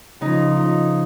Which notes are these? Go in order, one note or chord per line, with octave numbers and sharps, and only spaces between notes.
C#3 F3 D#4
D#4